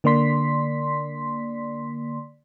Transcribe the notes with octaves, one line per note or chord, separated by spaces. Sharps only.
D3 A#3 D5 C6 B6